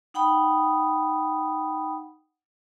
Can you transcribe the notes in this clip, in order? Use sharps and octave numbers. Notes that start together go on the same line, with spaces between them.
D#4 F#5 G5 B5 D#6